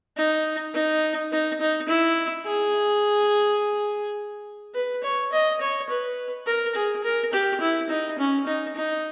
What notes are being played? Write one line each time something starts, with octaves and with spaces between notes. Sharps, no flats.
D#4
D#4
D#4
D#4
E4
G#4
B4
C#5
D#5
C#5
B4
A#4
G#4
A#4
G4
E4
D#4
C#4
D#4
D#4